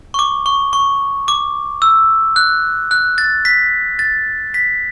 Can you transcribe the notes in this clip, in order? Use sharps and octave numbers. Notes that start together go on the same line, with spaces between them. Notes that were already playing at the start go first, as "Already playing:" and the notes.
C#6
D6
C#6
C#6
D6
E6
F#6
F#6
A6
B6
A6
B6